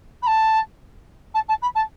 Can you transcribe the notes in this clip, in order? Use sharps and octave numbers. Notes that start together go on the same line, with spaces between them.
B5
A5
A5
A5
B5
A5